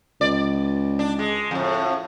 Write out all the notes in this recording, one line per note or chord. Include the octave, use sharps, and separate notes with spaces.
C#2 D5
D4
G#3
F2 A2